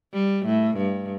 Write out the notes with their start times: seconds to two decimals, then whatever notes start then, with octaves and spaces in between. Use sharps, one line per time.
0.14 G3
0.45 A2
0.77 G2